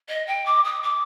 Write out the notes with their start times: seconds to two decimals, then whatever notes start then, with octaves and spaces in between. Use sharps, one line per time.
0.08 D#5
0.27 G5
0.45 D6
0.64 D#6
0.82 D6